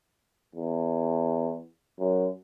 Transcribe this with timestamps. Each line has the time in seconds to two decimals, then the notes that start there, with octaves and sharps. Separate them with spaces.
0.56 E2
2.00 F#2